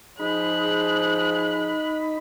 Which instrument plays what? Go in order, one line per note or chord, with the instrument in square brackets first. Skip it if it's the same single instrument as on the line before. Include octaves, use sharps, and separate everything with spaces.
[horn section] F3 G#4 [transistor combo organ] D#4 B5 [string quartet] F#6